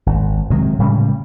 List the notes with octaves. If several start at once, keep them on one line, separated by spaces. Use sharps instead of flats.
G#1
C3 D#3 F#3 G#3
A2 C#3 G3 G#3